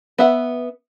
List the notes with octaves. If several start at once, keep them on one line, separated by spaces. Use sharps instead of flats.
B3 E5 F#5